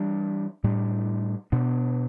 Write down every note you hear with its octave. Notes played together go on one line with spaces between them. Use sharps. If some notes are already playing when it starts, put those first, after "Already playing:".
Already playing: E3 G3 D4
A2 G3 D4
B2 B3 D4